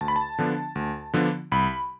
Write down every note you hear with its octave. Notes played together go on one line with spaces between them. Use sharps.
D2 A5
B5
A5
D3 F3 B3 D4
D2
D3 F3 B3 D4
C2 B5